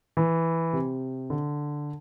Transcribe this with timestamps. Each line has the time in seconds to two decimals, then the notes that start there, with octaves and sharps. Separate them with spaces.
0.17 E3
0.73 C3
1.30 D3